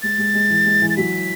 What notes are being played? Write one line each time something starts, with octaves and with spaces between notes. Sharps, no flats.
G#3 A6
G#3
G#3
E3
G#3
E3
A6
F#3 B6